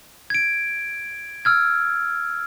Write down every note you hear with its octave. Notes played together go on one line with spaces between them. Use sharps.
G#6 D7
E6 F6 G#6